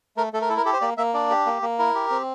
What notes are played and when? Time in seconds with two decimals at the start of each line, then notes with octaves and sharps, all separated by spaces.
0.17 A3 A#4
0.33 A3 A4
0.41 A#4
0.49 E4 A4
0.57 A#4
0.65 G4 A4
0.73 C5
0.81 A#3 D5
0.97 A#3 E5
1.14 D4 D5
1.30 G4
1.46 A#3
1.62 A#3
1.79 E4 A#4
1.95 G4
2.10 C4